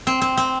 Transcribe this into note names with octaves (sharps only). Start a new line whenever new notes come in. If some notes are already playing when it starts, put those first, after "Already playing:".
C4
C4
C4